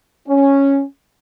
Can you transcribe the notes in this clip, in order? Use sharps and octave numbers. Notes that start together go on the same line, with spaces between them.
C#4